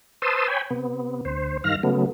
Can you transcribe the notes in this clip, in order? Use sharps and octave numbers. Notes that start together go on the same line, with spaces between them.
B4 C5 A5 C6 D#6 E6
C#5 G5 G#5 B5
C3 B3
D2 C5
G2 D#3 F5 F6 A#6
C#3 F#3 A3 B3